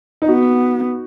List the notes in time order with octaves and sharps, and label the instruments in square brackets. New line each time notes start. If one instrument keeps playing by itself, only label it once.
[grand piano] D#4
[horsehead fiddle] B3 [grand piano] F#4